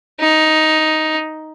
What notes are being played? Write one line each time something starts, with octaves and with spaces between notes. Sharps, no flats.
D#4